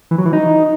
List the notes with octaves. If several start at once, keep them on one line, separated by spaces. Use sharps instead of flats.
E3
F#3
E3
D#4